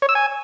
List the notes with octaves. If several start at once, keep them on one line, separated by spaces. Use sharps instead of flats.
C#5
E6
G#5